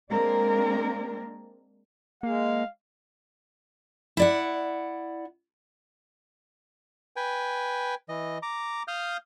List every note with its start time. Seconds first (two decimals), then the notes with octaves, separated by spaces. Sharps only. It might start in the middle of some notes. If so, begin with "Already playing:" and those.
0.11 G#3 A#3 C4 D4 A#4
2.23 G#3 A#3 F5
4.17 E4 D5 F#5
7.16 B4 G5 G#5
8.09 E3 D#5
8.43 A#5 D6
8.88 F5 D#6 F6 G6